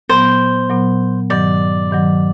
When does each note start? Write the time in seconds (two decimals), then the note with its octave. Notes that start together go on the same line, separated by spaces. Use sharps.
0.09 A#2 F#3 B3 C5
0.70 A#2 F#3 B3
1.30 G2 D#3 F#3 D5
1.91 G2 D#3 F#3